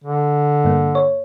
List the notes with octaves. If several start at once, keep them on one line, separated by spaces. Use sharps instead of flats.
D3
G2 A#3
C#5